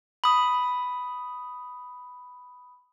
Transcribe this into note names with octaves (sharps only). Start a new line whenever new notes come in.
B5 D#6